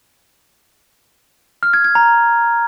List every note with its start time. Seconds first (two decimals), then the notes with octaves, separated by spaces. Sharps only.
1.63 F6
1.74 G#6
1.84 G#6
1.95 A#5